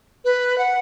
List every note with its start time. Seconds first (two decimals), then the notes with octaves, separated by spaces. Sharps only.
0.25 B4
0.58 F#5